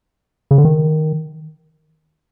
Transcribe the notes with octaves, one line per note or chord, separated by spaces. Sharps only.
C#3
D3
D#3